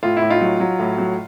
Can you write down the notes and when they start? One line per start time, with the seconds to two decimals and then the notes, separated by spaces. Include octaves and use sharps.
0.03 A2 F4
0.17 E4
0.22 A2
0.30 D#4 F4
0.41 F#3
0.60 F#3
0.79 A2
0.98 F#3